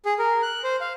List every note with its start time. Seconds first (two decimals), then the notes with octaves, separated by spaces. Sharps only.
0.05 G#4
0.19 A#4
0.42 F#6
0.64 C5
0.81 F5